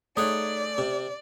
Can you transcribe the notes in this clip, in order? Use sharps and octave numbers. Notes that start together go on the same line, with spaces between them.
A3 D#4 G#4 C#5 D5 F#5 D#6
C3